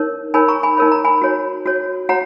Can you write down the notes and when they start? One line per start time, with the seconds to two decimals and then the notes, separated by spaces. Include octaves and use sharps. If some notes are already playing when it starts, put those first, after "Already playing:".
Already playing: D#4 A#4 C#5
0.34 D#4 A#4 C#5 G#5 B5
0.48 A#5 C#6
0.63 G#5 B5
0.77 D#4 A#4 C#5 B5
0.92 A#5
1.04 G#5 B5
1.22 F#4 C#5
1.66 F#4 C#5
2.09 F#4 C#5 F#5 A#5